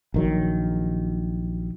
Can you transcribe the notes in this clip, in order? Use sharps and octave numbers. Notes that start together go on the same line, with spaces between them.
A#1 D#3 F#3